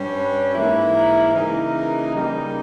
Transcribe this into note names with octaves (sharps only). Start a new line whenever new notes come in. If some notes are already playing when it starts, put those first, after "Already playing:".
Already playing: G2 G3 C#4
B4
G#2 E3 A#3 E4
A#4
C#3 E3 A#3 D#4 A#4
C#3 G3 A#3 D#4